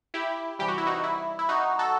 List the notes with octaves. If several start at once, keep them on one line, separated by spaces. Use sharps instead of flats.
E4 G4
C3 E3 G3 G4
F#4
E4
D#4 F#4
E4
E4
D#4 F#4
F#4 A4